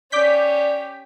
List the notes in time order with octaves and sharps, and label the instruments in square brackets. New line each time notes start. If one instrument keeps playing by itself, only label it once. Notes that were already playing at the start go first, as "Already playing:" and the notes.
[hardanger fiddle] C#4 G4 [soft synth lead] D5 [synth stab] D6 G6 B6